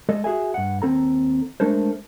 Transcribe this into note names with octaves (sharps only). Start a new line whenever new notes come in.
G#3 A4 D#5
F#4 G#4 E5 G#5
G2 F#5
D#2 C4 A4 A#5
G#3 A3 D4 A4 A#4 C5